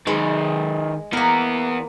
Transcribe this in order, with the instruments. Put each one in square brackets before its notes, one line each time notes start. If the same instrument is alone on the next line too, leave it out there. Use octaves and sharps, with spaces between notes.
[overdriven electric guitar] D#3 B4 [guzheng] G#3
[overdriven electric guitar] E3 B3 [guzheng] A#3 A#4